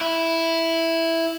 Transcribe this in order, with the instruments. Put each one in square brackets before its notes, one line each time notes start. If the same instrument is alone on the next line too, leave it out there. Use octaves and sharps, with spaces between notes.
[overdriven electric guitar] E4